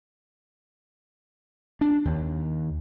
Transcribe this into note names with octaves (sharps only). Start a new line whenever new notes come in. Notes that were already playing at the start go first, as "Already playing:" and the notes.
D4
D#2